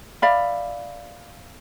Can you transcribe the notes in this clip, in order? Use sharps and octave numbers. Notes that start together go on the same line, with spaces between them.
D5 E5 F5 B5